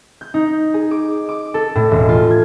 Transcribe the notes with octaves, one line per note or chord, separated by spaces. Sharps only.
G6
D#4
G#4
D6
D6
A4
A2
E1
F4
G#6